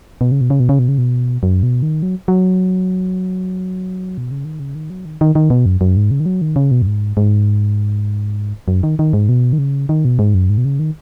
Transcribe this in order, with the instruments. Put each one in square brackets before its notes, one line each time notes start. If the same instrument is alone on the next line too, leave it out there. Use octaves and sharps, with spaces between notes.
[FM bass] B2
C#3
B2
C#3
B2
C#3
B2
C#3
B2
F#2
B2
D#3
F#3
F#3
B2
C#3
D#3
C#3
D#3
F#3
D#3
D#3
D#3
B2
F#2
F#2
G#2
C#3
D#3
F#3
D#3
C#3
B2
F#2
G#2
G#2
F#2
D#3
D#3
G#2
B2
D#3
C#3
D#3
B2
G#2
F#2
G#2
B2
C#3
D#3